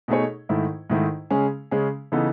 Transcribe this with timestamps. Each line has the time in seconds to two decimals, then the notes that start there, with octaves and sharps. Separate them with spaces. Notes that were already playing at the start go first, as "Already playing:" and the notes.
0.08 B2 A3 D#4 G#4 C#5
0.49 G#2 D#3 A3 E4
0.90 G#2 D#3 A3 E4
1.30 C#3 G#3 C#4 G#4
1.71 C#3 G#3 C#4 G#4
2.12 C#3 E3 B3 D#4 A4